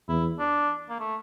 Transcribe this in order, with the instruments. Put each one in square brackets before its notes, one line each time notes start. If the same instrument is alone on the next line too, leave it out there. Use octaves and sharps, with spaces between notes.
[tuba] E2 [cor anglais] E4
[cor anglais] D4
A#3
A3